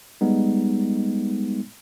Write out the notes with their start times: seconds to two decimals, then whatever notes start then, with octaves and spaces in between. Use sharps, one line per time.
0.21 G3 G#3 B3 D#4